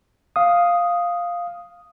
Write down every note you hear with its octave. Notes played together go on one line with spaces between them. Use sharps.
F5 D#6